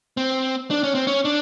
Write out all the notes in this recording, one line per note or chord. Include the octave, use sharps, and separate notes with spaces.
C4
D4
C#4
C4
C#4
D4